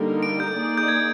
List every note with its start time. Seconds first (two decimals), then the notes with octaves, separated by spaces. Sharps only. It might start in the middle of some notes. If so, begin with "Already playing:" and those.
Already playing: D3 G3 A#3 D#4 A#4
0.23 D7
0.40 G6
0.56 A#3 D#4 G#4 D5
0.78 G6
0.88 G#6